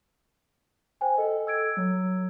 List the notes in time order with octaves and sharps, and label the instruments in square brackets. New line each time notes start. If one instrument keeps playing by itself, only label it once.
[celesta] C5 G5 G#5
[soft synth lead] A4 [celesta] D#5
[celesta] E6 G#6 D7
[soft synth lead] F#3